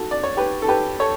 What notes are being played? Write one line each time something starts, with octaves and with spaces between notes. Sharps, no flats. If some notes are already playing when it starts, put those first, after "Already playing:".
Already playing: F#4 A4
D5
C#5
G4 B4
A4
G4 B4
A4 C#5